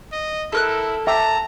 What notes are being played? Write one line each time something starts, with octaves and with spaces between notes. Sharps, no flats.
D#5
E4 A4 A#4 F#6
E5 G5 A5 A#5 D6